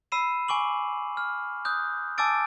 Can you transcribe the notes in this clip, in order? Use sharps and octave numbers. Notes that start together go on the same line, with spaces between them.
B5 E6 C7 D#7 E7
G#5 C#6 D6 F#7
F6
D#6 F#6 G6
G#5 A5 D6 E6 A6 D7